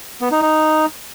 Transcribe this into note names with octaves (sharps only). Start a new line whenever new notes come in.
B3
D#4
D#4